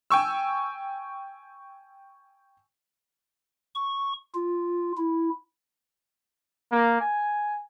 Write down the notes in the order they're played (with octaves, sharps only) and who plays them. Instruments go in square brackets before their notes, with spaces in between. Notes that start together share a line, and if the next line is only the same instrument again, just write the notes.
[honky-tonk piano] G5 G#5 C#6 E6
[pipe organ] C#6
F4
E4
[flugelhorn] A#3
G#5